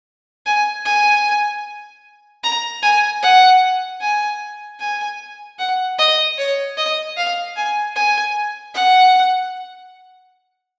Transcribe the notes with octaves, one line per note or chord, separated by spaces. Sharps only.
G#5
G#5
A#5
G#5
F#5
G#5
G#5
F#5
D#5
C#5
D#5
F5
G#5
G#5
F#5